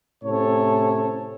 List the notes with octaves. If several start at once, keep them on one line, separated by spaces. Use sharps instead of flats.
A2 C3 C#4 A4 C#5